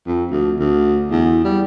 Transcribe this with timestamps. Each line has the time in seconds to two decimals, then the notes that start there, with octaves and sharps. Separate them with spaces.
0.07 F2
0.31 D2
0.59 D2
1.11 E2
1.45 G3